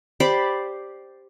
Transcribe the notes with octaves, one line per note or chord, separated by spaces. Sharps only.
G4 C5 D5 B5